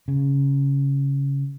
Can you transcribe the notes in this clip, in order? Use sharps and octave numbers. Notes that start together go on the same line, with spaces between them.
C#3